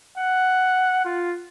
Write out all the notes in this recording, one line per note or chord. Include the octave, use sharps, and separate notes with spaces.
F#5
F4